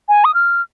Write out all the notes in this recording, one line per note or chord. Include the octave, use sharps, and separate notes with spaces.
G#5
D#6
F6